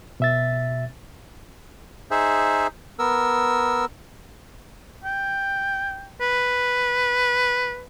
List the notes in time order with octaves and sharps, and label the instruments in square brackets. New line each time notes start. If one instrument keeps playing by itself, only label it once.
[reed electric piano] B2 E5 A6
[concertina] D#4 G#4 C5 E5
B3 A#4 E6
[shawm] G5
B4